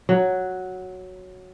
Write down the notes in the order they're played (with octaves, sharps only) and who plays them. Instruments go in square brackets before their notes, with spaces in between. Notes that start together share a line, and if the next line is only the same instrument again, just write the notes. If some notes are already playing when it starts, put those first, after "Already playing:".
[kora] F#3